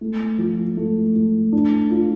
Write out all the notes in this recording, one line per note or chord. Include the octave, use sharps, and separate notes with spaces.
A3
F3
A3
A3
D4
F4